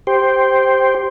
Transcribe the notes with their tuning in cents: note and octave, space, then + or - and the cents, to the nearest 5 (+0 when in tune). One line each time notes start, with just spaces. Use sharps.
G4 +0 C5 +0